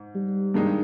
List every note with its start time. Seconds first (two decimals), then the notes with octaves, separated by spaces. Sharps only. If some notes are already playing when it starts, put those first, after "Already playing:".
Already playing: G#2
0.15 G3
0.54 G2 D#3 G#3 D#4